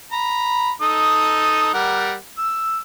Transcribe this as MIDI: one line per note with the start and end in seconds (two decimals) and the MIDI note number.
0.12 0.71 82
0.12 0.71 83
0.81 1.69 63
0.81 1.69 69
0.81 1.69 87
1.74 2.14 55
1.74 2.14 70
1.74 2.14 78
2.38 2.78 88